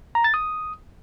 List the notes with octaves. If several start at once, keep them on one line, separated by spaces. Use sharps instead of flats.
A#5
A6
D#6